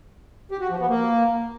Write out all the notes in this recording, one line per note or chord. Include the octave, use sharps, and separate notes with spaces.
G4
F#4
F3
B3
A#3